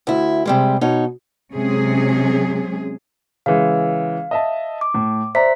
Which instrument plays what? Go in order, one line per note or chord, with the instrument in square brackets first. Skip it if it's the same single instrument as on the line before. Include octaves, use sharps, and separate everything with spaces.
[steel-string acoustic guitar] D2 E4
C3 G3 G#3
B2 D#4 C#5
[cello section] C3 F#3 G#3 C#4 G#4
[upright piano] C#3 E3 G#3 [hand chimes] F5
[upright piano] D#5 E5 A5
[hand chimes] D6
[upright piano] A2
[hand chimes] C5 E5 B6 [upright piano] D5 A#5